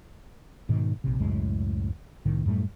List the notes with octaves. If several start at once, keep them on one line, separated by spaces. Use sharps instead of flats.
G#2 B2 D#3
A#1 C3
C#2 F#2 A2 G#3
C2 A2 D#3
F#2 A2 G3 A3